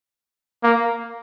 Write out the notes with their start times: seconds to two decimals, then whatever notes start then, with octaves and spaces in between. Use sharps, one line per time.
0.63 A#3